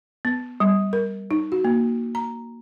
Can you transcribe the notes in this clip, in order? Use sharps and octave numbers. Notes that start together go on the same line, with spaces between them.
B3
G3
A#4
D#4
F#4
A#3
A#5